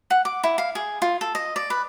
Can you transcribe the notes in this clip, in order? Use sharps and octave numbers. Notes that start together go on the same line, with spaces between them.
F#5
D6
E4
F5
G#4
F4
A4
D#5
D5
B4